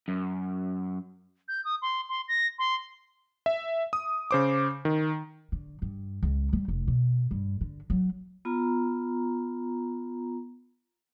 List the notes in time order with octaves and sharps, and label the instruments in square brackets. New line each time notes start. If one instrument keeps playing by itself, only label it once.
[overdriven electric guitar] F#2
[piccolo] G6
D#6
C6
C6
A#6
C6
[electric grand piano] E5
D#6
C#3 C5 D6
D#3
[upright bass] D3
G2
C#2
G3
F1
B2
G2
D3
F#3
[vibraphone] B3 F4 A#5